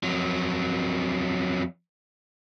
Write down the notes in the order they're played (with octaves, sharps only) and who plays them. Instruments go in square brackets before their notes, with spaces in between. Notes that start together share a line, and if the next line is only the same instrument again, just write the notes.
[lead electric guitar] F2 F#3